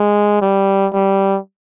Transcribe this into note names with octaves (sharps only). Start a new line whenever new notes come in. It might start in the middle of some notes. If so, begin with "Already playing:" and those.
Already playing: G#3
G3
G3